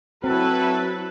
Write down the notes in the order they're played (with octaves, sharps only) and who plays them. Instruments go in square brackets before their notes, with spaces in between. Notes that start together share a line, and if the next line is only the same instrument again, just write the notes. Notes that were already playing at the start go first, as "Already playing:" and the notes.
[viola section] F#3 E4 B4 [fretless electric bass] C4 [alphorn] F#4 [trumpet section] A4